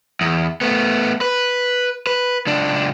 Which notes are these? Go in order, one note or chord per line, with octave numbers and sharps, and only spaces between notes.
E2
A3 B3
B4
B4
C#2 D4